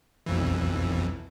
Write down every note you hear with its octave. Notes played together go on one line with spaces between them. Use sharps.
B1 F2 E3